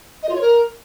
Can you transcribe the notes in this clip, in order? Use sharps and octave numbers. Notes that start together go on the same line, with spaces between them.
D#5
F4
C#5
A#4